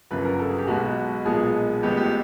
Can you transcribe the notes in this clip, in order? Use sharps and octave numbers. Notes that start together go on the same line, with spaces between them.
G1 F#2 C#3 F3 B4
A#4
A4
G#4
G4
B1 B2 G#3 F#4
B1 A#2 F3 G#3 B3 G#4
A1 A2 F3 G#3 B3 G4
G4